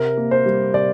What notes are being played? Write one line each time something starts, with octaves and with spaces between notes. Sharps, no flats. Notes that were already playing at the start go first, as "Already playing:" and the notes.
Already playing: C3 A#4
A#3
C5
G3
C3 D5